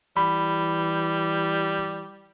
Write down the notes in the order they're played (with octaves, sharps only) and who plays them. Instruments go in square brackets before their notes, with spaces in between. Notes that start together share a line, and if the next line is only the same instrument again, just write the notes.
[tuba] E3 [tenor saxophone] G3 [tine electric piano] B5